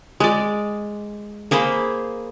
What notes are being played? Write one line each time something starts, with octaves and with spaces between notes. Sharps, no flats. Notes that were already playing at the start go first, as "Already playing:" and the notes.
G#3 D5
A#3 G#4 C5 B5